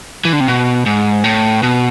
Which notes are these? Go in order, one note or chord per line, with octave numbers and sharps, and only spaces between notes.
E3
D3
C3
B2
G#2
A2
B2